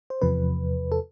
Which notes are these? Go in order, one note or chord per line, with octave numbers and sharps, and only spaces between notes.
C5
E2 C3 F3 B4
A4